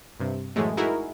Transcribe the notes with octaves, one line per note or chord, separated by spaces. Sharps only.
G2 C3
F#2 A2 E3 G#3 A3
D#4 E4 F#4 G#4 A#4